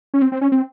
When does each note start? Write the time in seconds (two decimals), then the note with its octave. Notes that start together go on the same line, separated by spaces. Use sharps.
0.14 C#4
0.22 C4
0.32 C4
0.41 C#4
0.52 C4